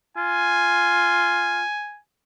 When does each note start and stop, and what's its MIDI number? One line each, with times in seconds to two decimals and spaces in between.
0.17 1.62 65
0.17 2.00 80